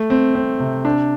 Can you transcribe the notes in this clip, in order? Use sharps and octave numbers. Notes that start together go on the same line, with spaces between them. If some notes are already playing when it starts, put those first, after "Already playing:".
Already playing: A3
C4
C4
C3
D4